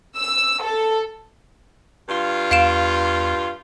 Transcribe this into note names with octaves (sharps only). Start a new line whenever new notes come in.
E6
A4
G2 F4
E2 F5 D7 E7